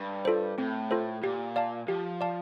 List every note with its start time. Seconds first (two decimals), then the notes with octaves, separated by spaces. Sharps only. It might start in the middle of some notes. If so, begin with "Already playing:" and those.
Already playing: G2
0.25 F4 A4 C5
0.58 A2 C4
0.91 F4 A4 C5
1.23 A#2 G4
1.56 D5 F5 A5
1.88 F3 G4
2.21 D5 F5 A5